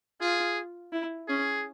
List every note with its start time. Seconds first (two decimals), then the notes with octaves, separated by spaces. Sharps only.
0.21 F4 G#4
0.92 E4
1.28 C#4 G#4